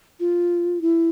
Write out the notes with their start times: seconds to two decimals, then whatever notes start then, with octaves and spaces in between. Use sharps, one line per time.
0.20 F4
0.82 E4